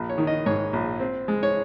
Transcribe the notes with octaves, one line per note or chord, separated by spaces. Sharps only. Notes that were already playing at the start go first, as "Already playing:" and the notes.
Already playing: A#1
C#5
D#3
D#5
G#2 C#5
A#1
C4
G#3
C#5